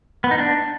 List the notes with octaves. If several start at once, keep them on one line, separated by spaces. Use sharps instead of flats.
B3
D#4
D4